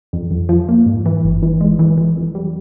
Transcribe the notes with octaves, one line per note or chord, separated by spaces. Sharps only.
F2
F2
F3
A#3
G#2
E3
G1
E3
G#3
E3
E3
F2
G3